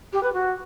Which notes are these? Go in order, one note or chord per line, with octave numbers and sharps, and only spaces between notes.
G4
B4
F#4